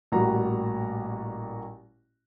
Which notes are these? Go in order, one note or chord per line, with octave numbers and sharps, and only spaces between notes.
A1 A#2 G3 F#4 A#5